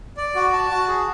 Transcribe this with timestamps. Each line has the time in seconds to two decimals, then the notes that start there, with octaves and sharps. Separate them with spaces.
0.17 D5
0.35 F#4
0.53 A5
0.70 F#4
0.88 G#4